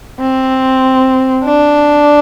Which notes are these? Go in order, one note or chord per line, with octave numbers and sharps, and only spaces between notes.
C4
D4